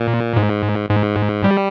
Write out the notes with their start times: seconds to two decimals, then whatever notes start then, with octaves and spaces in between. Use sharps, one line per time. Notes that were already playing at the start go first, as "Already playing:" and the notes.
Already playing: A#2
0.36 G#2
0.90 G#2
1.44 G3